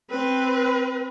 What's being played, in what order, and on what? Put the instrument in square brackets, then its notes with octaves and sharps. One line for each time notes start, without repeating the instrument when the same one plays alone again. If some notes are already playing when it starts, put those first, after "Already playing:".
[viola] C4 B4